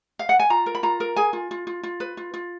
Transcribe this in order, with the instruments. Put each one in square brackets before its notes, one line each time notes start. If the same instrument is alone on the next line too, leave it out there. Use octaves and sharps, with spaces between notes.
[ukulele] F5
F#5
G#5
F4 A#5
A#4
B5
F4 A#5
A#4
G#4 G#5
F4
F4
F4
F4
B4
F4
F4